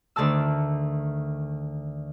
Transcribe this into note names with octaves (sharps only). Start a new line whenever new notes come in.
D2 D3 D#3 A5 E6